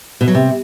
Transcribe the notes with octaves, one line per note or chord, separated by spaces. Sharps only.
B2
F#3
C3